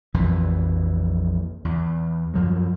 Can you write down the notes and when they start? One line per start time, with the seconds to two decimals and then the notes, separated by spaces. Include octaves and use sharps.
0.14 A#1 F2 E3
1.65 E2
2.34 F#2 F3 F#3